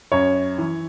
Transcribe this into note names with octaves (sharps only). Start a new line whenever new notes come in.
F#2 C#5
E3